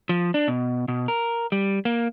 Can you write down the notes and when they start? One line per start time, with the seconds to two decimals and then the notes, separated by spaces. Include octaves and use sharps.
0.09 F3
0.34 D4
0.48 B2
0.88 B2
1.08 A#4
1.52 G3
1.85 A#3